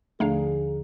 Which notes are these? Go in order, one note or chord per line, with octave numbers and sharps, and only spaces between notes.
D#2 D3 F3 A3 D4 G#4 F5 A#5